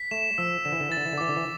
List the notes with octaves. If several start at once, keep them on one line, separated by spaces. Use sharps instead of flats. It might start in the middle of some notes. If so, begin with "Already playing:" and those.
Already playing: B6
A3 E7
F3 E6
D3 E7
E3
D3
E3 A6
D3
E3
D3
E3 D6
D3
E3